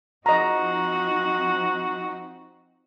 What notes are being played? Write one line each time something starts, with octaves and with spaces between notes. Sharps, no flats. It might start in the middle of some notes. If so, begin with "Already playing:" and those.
F3 C4 D#4 F#4 D#5 A#5